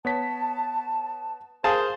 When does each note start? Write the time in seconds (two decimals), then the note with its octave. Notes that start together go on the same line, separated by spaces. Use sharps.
0.05 B3 C#5 A5 B6
1.64 G#4 A#4 C5 F5 A5